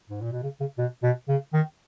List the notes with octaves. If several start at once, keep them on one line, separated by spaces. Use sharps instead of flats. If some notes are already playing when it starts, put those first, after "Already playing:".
G#2
A#2
B2
C#3
C#3
B2
B2
C#3
D#3